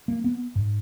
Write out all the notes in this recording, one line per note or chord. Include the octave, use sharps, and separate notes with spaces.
A#3
B3
G#2